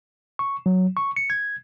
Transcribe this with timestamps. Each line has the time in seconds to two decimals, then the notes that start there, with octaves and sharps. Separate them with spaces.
0.39 C#6
0.66 F#3
0.97 C#6
1.16 C#7
1.30 G#6